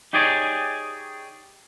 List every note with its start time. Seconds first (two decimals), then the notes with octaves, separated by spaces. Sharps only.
0.13 D#4 G4 G#4 C#5 D5